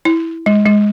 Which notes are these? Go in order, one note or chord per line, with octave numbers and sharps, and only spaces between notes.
E4
G#3
G#3